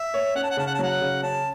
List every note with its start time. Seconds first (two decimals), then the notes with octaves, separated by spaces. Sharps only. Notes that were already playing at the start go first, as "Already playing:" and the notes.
Already playing: E5
0.14 C#5
0.35 C#4 F#5
0.43 A5
0.51 F#5
0.57 C#3 A5
0.67 F#5
0.75 A5
0.79 F#3 F#5
1.01 C#3
1.23 C#4 A5